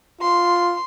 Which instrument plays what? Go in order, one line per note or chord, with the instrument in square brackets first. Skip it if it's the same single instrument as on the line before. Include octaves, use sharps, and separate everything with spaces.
[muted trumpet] F4 [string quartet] C6